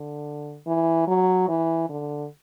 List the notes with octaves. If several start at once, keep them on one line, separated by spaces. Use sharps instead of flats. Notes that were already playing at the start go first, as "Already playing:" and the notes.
Already playing: D3
E3
F#3
E3
D3